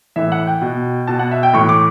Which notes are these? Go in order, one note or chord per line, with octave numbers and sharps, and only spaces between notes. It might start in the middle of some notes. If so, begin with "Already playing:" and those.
A2 E3 E5
F#5
G5
B2
B2 A5
F#5
E5
G5
A2 E3 C#6
D6